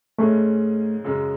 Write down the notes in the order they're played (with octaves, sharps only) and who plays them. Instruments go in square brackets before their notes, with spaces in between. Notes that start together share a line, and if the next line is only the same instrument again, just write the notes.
[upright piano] G#2 G#3 C#4 G#4 [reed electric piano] A3
[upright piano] F#2 C#3 G#3